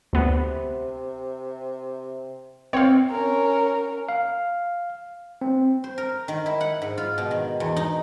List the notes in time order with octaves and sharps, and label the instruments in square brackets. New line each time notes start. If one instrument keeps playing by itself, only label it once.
[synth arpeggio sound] D2 B3 [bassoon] C3
[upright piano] C4 [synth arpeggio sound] C#5 F5
[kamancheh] C#4 A#4
[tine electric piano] F5
C4
[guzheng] C5
A#4
D#3
E4
F#5
G#2
F4
B2
D#3
E2
D#4